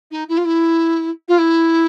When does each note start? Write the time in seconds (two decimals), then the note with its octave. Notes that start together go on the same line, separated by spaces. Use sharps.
0.11 D#4
0.29 E4
0.37 F4
0.45 E4
1.28 F4
1.39 E4